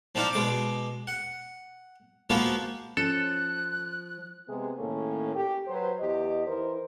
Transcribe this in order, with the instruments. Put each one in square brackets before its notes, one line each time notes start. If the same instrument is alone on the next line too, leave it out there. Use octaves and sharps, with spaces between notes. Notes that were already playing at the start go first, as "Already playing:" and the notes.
[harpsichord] F3 C4 D4 D#4 F5
B2 G#3 D6
F#5
F3 G#3 A#3 B3 F4 F#4
[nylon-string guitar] F3 [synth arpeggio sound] C#4 [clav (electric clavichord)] A4 [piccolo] F#6
[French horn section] C3 G#3 B3 G#4
A2 D#3 A#3 C#4 A4
G4
F#3 B4 C5
E2 G4 D#5
E3 D#4 A#4 C5